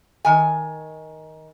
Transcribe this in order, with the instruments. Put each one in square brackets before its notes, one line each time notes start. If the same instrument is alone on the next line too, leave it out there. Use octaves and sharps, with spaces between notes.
[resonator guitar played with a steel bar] D#3 G#5